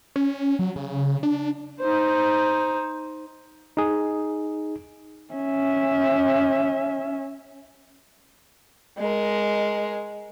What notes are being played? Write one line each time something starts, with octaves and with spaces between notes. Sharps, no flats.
C#4
F#3
C#3
D4
D#4 C5
D#4 G#4
C#4 E5
G#3 A#4